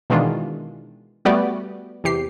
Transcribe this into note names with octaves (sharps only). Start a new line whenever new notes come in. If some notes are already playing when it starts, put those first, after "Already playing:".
B2 D#3 E3 G#3 D4 F4
G3 A3 B3 F#4 G4 D5
E2 C3 G4 C7